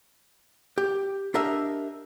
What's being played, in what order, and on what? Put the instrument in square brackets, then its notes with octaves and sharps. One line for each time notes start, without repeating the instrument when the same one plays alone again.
[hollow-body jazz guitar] G4
D4 G4 A#4 D#5 E5